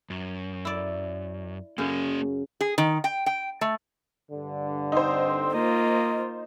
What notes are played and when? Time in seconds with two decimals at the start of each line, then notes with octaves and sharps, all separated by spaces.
0.10 F#2
0.65 E4 D5
1.78 F#2 C#3 A#3 G#4
2.61 G#4
2.78 D#3
3.04 G5
3.26 G5
3.61 A3
4.30 G2 D3
4.92 C4 D#4 C5
5.53 A#3 F4 D#5